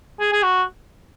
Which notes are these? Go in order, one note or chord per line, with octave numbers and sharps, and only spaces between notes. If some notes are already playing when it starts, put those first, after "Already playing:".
G#4
G#4
F#4